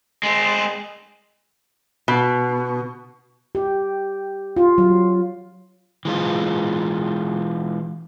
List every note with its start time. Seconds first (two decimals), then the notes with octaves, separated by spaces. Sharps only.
0.23 G#3 C4
2.08 B2
3.55 G4
4.57 F4
4.78 F#3
6.05 E3 G#3 F4